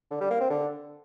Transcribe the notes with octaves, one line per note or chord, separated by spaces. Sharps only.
D3
G3
A#3
C4
D3